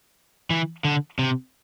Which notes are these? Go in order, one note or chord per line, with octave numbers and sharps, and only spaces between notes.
E3
D3
C3